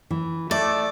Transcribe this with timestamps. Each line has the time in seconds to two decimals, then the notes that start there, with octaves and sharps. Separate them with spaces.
0.11 E3
0.51 A3 D5 E5